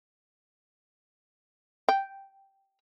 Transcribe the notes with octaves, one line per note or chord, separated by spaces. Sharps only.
G5